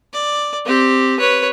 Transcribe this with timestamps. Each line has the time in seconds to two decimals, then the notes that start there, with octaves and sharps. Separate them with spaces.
0.13 D5
0.65 C4 G4
1.20 B4 C#5